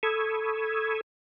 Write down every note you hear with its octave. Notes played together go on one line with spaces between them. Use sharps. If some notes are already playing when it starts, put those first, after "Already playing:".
A4 B5 C#6 D#6 E6 G#6